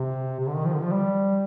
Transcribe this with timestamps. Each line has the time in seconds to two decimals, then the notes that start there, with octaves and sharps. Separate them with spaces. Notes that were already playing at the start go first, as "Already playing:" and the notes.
Already playing: C3
0.40 C3
0.48 D3
0.56 D#3
0.65 F3
0.74 D3
0.83 F3
0.92 G3